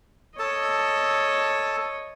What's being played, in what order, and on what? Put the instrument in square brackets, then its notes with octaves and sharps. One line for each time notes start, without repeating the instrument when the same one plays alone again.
[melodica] A4 A5 [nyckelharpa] C#5 D#5